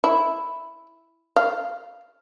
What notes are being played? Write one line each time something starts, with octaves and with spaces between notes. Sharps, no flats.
E4
F5